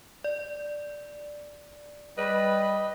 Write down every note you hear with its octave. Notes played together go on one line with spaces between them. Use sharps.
D5
G3 B4 D#5